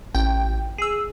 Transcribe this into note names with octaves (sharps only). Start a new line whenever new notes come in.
A1 G5
G#4 E6